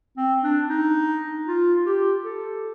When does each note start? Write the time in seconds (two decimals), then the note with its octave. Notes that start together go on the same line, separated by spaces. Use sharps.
0.17 C4
0.43 D4
0.69 D#4
1.47 F4
1.86 G4
2.24 A4